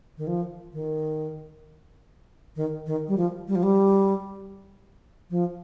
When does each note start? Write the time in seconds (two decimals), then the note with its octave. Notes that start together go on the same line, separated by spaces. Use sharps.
0.18 D#3
0.27 F3
0.73 D#3
2.56 D#3
2.86 D#3
3.08 G3
3.17 F3
3.48 G3
3.55 F3
3.63 G3
5.30 F3